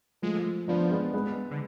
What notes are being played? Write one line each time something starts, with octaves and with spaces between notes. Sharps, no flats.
F3 G#3 A3
F3 B3 D4
G#3 B3
G#3 B3
D3